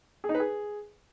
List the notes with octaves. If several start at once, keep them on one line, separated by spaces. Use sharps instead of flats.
G#4
D#4
B4
G#4